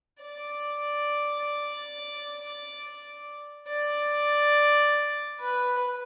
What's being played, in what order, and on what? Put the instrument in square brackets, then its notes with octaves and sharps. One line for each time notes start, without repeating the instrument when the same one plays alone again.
[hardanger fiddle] D5
D5
B4